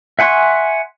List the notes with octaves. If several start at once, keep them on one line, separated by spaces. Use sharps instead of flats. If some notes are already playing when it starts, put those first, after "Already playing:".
E5 F#5 G#5 C6 C#6